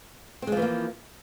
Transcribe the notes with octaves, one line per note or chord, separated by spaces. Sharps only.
E3 F3 G#3 A#3 C4